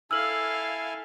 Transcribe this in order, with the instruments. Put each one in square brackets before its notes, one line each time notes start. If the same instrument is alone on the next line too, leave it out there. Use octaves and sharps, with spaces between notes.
[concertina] E4 G#5 [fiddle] A4 F5 [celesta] E6 F6 F#7